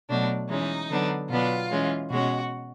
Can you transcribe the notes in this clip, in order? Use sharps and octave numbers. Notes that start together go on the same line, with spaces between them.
B2 F#3 A3 D4
E3 G#3 C#4 D#4
D3 F#3 B3 D4
B2 F#3 B3 D4 F4
E3 G#3 C#4
B2 G#3 C#4 F#4